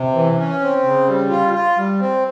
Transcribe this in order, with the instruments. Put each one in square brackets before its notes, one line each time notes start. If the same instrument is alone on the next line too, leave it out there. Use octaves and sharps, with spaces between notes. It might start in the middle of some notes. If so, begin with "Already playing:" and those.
Already playing: [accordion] C3
E3
C#4
C4
C#3
G3
F4
F4
G3
C4